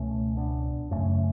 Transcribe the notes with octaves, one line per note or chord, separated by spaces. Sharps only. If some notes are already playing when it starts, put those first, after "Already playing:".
Already playing: C#2 B2 A3 C#4
B3 D4
F#2 C#3 A3 C#4